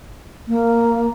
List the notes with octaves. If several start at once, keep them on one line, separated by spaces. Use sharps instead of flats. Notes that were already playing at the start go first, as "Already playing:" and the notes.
A#3